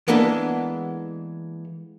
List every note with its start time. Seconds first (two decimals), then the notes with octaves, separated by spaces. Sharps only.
0.08 E3 G#3 A#3 B3 D4 A4